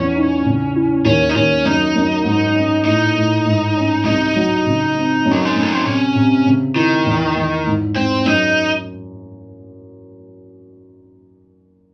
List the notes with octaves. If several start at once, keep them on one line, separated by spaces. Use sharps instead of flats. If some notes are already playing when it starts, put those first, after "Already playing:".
Already playing: E2 C#4
D#4
C#3
E4
D#2 C#4
D#4
D#2 C#4
F#2 D#4
F#2
G#2
C#4
A2 D#4
A2
G#2
C#4
C2 D#4
F#3
C#3
C4
F#2
F#3
G#3
F#2 A3
C4
C3 C#4
C3
C#3
D#3 E4
E2
E2
G#2
G#2 C4
F#2 D#4